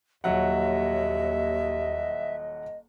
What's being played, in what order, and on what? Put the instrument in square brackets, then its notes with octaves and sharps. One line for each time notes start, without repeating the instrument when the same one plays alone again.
[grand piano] D#1 F#3 F#5 [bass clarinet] D#2 [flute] D#5 [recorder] E5